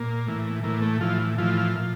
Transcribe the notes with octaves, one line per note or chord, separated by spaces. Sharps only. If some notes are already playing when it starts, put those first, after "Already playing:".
Already playing: A#2 A#3
A2 E3
A2 E3 A#3
A3
A2 E3 F3 F4
A2 E3 F3 F4
A#2